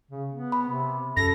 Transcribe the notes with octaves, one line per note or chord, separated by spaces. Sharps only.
C#3
B3
B5
C3
F#2 A4 A#6